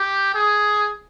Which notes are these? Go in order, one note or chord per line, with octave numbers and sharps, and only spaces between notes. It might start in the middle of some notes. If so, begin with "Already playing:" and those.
Already playing: G4
G#4